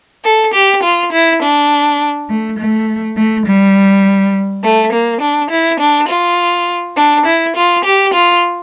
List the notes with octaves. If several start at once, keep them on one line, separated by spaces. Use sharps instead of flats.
A4
G4
F4
E4
D4
A3
A3
A3
G3
A3
A#3
D4
E4
D4
F4
D4
E4
F4
G4
F4